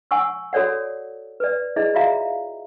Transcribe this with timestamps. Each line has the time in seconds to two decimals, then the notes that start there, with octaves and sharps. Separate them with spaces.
0.11 F#5 G#5 C#6 E6
0.53 F#4 A4 C#5 D5 F#5
1.40 B4 D5
1.76 E4 G#4 D5 D#5
1.95 F4 F#4 E5 F5 A#5